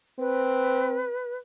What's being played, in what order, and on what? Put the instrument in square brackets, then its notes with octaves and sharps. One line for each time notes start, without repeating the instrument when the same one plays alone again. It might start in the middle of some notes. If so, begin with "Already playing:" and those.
[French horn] C4 [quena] B4